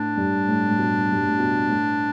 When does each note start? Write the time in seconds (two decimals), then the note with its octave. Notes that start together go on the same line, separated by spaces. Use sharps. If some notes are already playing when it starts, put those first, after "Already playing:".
Already playing: A2 D4
0.17 G2
0.48 A2
0.67 A2
0.78 B2
1.12 G2
1.26 A2
1.39 B2
1.69 A2